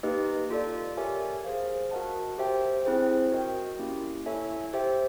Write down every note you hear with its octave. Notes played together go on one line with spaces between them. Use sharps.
A#3 D#4 G4 B4 D#5
F4 A4 D5
G4 A#4 C#5 E5 G#5
G#4 C5 F5
F#4 A#4 D#5 F#5 A5
G4 C5 E5 G5
C4 E4 G#4 C5
F#4 A#4 D#5 G5
A#3 C#4 E4 G4
E4 A4 C#5 E5 G#5
G4 C5 E5 G5